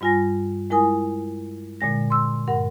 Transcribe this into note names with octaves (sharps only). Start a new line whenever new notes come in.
G2 G3 F4 G#5 A#6
G#3 E4 A#4 G#5 D#6
A#2 D3 G#3 A#6
C6 E6
G2 A#4 F#5